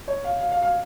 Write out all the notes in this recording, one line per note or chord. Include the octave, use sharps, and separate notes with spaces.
C#5
F5
F5
F5
F5